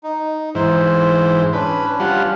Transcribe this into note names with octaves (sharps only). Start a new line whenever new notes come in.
D#4
G#2 E3 C5
C#4 D4 B4
G3 F4 F#5